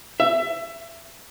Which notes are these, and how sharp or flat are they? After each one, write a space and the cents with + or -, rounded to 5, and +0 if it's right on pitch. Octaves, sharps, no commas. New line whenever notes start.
E5 +20